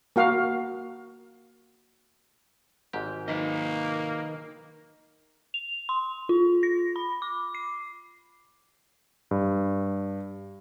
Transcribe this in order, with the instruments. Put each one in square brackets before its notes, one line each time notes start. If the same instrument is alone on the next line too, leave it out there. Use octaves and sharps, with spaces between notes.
[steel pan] A#3 F#4 F5
[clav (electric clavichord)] G#1 G#2 G4
[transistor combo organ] D#3 [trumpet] A#3 [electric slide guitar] D#4 B4 D#5
[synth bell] F7
C6
F4
A#6
B5
D6
C7
[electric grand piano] G2